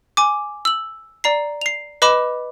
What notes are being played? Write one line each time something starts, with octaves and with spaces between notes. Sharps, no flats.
G#5 D6
E6 F#7
D5 A#5 C7
C7 F7
B4 D#5 B5 D6 E7